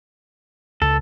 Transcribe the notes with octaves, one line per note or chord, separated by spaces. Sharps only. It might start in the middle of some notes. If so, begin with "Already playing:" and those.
C#2 A4